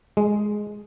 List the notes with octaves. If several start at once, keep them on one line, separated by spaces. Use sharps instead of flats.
G#3